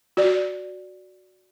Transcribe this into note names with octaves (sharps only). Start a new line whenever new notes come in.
F#4 D5